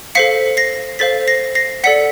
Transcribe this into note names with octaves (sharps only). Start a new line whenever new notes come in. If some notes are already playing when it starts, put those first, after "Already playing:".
A4 C5 F5 B6 C#7
A#6 C7
A4 C5 F5 A6 B6
A#6 C7
A#6 C7
A4 D5 F#5 B6 C#7